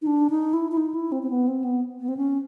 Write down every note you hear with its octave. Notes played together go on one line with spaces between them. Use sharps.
D#4
D4
D#4
E4
E4
D#4
E4
C4
C4
B3
C4
B3
B3
C4
C#4